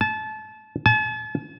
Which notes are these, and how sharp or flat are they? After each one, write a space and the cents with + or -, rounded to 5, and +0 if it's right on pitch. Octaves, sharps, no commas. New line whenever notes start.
A5 -25
A5 -40